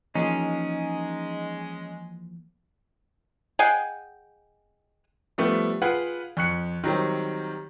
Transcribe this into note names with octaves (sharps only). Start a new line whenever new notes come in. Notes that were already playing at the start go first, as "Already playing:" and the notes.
E3 F3 G#3 A#3 C#4 D#4 G#4
G#4 D#5 F#5 G5
F3 G3 A3 B3
F4 G#4 B4 F#5 G5
F2 C#6 F#6 C#7
D#3 F#3 G3 C4